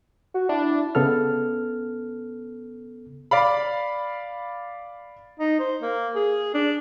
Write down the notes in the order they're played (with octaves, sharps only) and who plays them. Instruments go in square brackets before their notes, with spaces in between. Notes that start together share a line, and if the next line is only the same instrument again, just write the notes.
[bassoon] F#4
[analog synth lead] D4 [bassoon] E4
[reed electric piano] C#3 B3 A4 F6
[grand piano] D5 F5 B5
[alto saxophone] D#4
C5
A#3
G#4
D4